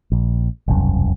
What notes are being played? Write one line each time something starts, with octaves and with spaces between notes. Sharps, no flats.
A#1
E1 C2 F#2